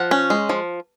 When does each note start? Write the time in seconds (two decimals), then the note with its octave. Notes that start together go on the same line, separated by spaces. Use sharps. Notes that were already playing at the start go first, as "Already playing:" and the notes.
Already playing: F3 F#5
0.11 C#4
0.30 G#3
0.49 F3